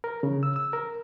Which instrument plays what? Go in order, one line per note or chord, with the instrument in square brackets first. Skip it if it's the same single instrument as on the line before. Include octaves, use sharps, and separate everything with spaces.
[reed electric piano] A#4
C#3
E6
E6
A#4